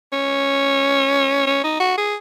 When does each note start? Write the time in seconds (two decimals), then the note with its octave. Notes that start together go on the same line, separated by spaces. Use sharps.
0.12 C#4
1.47 C#4
1.64 D#4
1.80 F#4
1.98 G#4